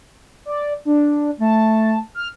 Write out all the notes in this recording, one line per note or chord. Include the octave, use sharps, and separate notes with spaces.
D5
D4
A3 A5
F6